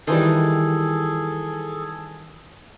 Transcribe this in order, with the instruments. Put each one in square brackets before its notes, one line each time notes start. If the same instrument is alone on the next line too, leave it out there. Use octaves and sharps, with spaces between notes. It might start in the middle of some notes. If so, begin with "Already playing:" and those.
[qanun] D#3 E3 G3 [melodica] G#4 A4